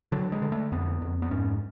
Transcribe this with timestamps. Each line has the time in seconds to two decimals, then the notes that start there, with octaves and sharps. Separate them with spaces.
0.12 D3 F#3
0.32 G#3
0.42 D3
0.52 A3
0.72 F2 B3
1.02 F2
1.22 B3
1.31 G#2 C#4